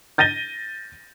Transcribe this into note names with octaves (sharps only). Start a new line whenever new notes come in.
G6 A6 A#6 D#7 G7